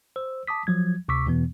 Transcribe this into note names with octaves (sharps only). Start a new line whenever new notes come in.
C5 E6
A5 D6 D#6 B6
F3 F#3 G#6
D2 C3 C#6 D6 E6 B6
E2 B2 E3 B3